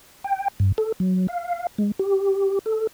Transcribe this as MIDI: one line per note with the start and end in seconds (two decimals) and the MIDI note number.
0.24 0.48 79
0.60 0.72 43
0.78 0.92 69
1.00 1.27 54
1.28 1.67 77
1.78 1.92 56
1.99 2.59 67
2.66 2.87 69